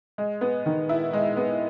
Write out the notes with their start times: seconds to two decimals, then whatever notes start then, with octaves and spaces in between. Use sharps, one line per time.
0.18 G#3
0.41 B3
0.66 D#3
0.89 E4
1.13 G#3
1.37 B3